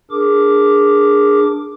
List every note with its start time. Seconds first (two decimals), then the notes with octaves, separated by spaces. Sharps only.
0.11 D4 G#4 A#4 D6